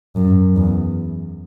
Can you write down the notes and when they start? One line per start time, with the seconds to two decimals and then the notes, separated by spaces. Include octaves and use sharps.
0.16 F#2
0.56 E2